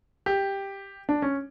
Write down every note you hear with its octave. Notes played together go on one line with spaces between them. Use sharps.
G4
D4
C#4